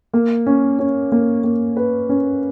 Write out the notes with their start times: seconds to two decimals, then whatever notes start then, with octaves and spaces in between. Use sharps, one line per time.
0.13 A#3
0.46 C#4
0.79 C#4
1.12 A#3
1.44 A#3
1.77 B4
2.09 C#4